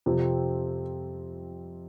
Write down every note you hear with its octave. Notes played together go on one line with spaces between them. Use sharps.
F2 C3 F3 C4